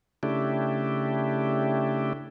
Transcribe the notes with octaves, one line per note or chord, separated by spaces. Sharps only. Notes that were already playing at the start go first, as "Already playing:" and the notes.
C#3 A3 D4 E4 G4